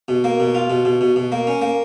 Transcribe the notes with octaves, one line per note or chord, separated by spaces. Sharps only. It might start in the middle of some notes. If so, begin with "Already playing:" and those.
B2
A#3
B2
F4
B2
B2
B2
B2
A#3
C#4
A#3